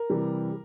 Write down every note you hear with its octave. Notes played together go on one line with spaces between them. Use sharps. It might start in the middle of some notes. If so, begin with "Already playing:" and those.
Already playing: A#4
C3 E3 G3